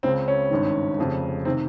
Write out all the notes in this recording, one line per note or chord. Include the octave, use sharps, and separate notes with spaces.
C#2 C#3 C4
C#4
G#1 G2 D#3
F1 F2 C#3
C3 D#3 C4